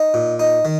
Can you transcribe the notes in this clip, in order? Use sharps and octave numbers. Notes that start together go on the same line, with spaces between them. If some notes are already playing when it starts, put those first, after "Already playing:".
Already playing: D#4
A#2
D#4
D#3